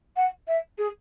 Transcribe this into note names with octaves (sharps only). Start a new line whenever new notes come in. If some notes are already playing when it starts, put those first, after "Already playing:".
F#5
E5
G#4